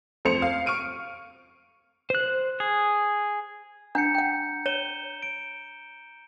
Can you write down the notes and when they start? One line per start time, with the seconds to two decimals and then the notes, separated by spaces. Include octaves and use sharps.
0.25 F2 A3 C5 C#7 F7
0.42 F5
0.66 C#6 F6 D7 D#7
2.10 C5 F#6
2.60 G#4
3.95 D4 F#5 A#5 G6 C#7
4.15 F#5 G5
4.66 C#5 D#7 E7 G7
5.22 D7